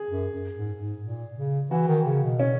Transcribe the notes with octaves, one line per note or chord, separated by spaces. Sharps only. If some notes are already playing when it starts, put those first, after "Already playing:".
Already playing: G#4
F#2
F#2
G#2
G#2
A#2
C#3
E3 F#4
D#3
C#3
B2
C#4